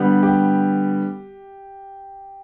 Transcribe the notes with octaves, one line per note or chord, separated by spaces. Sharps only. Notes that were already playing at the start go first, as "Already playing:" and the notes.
Already playing: D3 G3 B3
G4